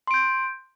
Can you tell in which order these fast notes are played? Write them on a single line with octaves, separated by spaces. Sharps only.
C6 D7 G6